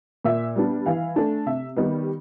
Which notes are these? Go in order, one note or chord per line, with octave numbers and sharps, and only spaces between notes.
A#2 E5
G3 B3 D4
E3 F5
A3 D4
C3 E5
D#3 G3 B3 D#4